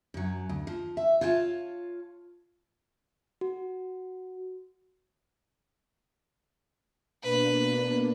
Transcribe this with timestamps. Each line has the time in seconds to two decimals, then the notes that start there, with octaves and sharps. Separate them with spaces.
0.14 F#2 F#3
0.49 D2
0.67 F3
0.97 E5
1.21 F4 C#5 F5 G5 A5
3.41 F#4
7.23 B2 A#3 D4 B4